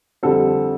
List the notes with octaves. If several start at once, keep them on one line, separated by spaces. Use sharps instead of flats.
F2 D3 G3 C4 A4